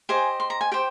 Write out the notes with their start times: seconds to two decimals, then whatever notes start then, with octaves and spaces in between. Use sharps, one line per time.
0.09 G4 C5 D#5 G#5
0.40 C6
0.50 A#5
0.61 G#5
0.71 G4 C5 G5